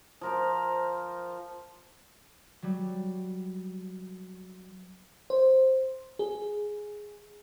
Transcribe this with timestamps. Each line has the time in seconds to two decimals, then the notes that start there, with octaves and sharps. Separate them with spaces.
0.21 F3 A#4 C5
2.62 F#3 G3
5.30 C5
6.19 G#4